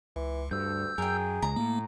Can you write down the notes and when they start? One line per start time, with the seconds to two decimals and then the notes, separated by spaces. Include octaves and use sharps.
0.16 C#2 E3
0.51 D2 G2 E6 G6
0.98 F#2 G#4 A#4 G5
1.42 C#2 A#5
1.56 A2 A#3